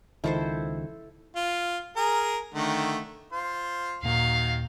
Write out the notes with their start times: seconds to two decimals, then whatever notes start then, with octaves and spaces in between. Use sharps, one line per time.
0.24 C#2 D#3 F3 E4 A4 C5
1.36 F4
1.96 G#4 A#4
2.54 D3 D#3 A3
3.32 F4 C5 C6
4.03 D#1 A#2 D#3 F#3 F5